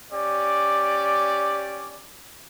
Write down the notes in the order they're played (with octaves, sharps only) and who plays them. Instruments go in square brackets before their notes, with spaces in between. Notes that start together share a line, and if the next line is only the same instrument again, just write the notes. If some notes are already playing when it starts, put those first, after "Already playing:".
[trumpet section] C#4 G4 D5